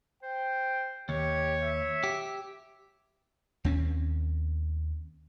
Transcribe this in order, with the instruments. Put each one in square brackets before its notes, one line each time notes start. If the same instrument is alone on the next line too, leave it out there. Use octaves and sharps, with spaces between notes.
[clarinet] C5 [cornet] G5
[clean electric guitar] D#2 [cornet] G4 [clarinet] C#5
[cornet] E5
[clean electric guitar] G4
[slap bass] D#2 C4 C#4